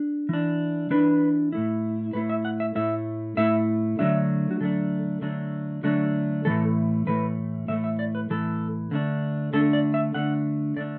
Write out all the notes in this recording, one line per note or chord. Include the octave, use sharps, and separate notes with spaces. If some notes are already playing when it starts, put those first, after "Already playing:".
Already playing: D4
E3 D4
E3 D4 B4
A2 A3 E4
A2 A3 E4 B4
E5
F#5
E5
A2 A3 E4 E5
A2 A3 E4 E5
D3 F#3 A3 D4 E5
F#4
D3 F#3 A3 D4 A4
D3 F#3 A3 D4
D3 F#3 A3 D4 F#4
A2 E3 A3 A4
A2 E3 A3 B4
A2 E3 A3 E5
E5
D5
B4
A2 E3 A3 A4
D3 A3 D4
D3 A3 D4 A4
D5
E5
D3 A3 D4 F#5
D3 A3 D4 D5